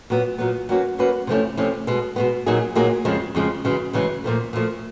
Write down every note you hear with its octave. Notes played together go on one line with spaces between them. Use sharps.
A#2 F#3 B3
A#2 F#3 B3
F#3 A#3 C#4 F#4 B4
F#3 A#3 C#4 F#4 B4
C3 F3 A3 C#4 E4
C3 F3 A3 C#4 E4
B2 G#3 B3
B2 G#3 B3
A#2 F#3 A#3 D#4 G#4
A#2 F#3 A#3 D#4 G#4
F2 C#3 F3 G#3
F2 C#3 F3 G#3
F#2 C#3 E3 G#3
F#2 C#3 E3 G#3
A#2 F3 A3
A#2 F3 A3